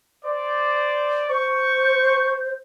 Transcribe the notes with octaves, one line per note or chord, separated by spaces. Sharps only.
C5 D5
C5 C#6